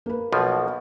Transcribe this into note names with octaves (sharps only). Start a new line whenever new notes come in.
A#3 B4
B1 B2 F3